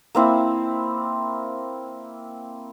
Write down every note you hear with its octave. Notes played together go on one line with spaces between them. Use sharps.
A#3 C4 E4